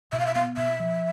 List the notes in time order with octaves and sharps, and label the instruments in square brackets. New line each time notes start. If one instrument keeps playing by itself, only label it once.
[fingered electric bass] B2 [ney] E5
[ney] F5
E5
[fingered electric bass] B3 [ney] F5
[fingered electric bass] B2 [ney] E5
[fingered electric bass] F3